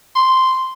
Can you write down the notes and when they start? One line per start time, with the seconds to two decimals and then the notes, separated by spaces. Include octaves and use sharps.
0.15 C6